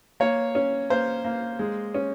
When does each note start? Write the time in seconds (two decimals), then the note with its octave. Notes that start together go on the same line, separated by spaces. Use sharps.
0.20 A#3 C#5
0.55 C#4
0.90 A#3 C5
1.25 A#3
1.59 G#3
1.95 C#4